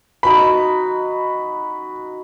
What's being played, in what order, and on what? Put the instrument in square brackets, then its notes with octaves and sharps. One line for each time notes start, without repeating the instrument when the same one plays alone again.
[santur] D#4 F#4 B4 [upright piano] B5